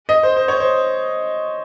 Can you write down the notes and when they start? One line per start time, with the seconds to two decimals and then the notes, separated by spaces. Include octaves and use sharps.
0.09 D#5
0.23 C5
0.37 C5
0.48 C#5
0.60 C5